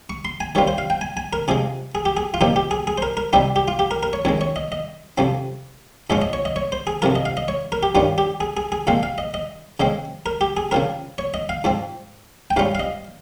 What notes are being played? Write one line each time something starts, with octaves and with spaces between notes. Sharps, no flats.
C#6
C6
G#5
D#3 G3 C4 F4 C#5
C5
F5
G5
G#5
G#5
A#4
C3 F3 G#3 G#4
G#4
G4
G#4
F4
A#2 F3 C4 D#4 G4
G4
G#4
G#4
C5
A#4
A#4
C3 G3 C4 D#4 G4
G4
F4
G4
A#4
A#4
C#5
F2 D#3 G#3 C#5
C#5
D#5
D#5
F2 C3 F3 C4
G#2 F3 G#3 C#4 F4 D#5
D#5
C#5
D#5
C#5
C5
G#4
F2 C3 F3 A#4
D#5
F5
D#5
C#5
A#4
G4
G2 D#3 G3 C#4 F4
G4
G#4
G#4
G#4
A#2 F3 G#3 C4 F5
F5
D#5
D#5
C#3 G#3 C4 D#5
A#4
G4
G#4
C#3 F3 C4 A#4
C#5
D#5
F5
G#2 F3 C4
G5
G#2 G3 C#4 F4 F5
F5
D#5